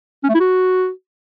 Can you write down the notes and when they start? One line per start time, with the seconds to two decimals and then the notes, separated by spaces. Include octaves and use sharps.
0.24 C#4
0.29 A3
0.35 E4
0.40 F#4